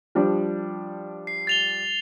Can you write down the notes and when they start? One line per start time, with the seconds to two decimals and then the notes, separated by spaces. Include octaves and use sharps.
0.15 F3 G3 D4
1.27 C7
1.47 A6 F7 G7